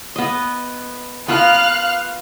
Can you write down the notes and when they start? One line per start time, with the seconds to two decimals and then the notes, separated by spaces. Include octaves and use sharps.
0.16 B3 D#5
1.28 B3 F4 A#4 F5 F6 F#6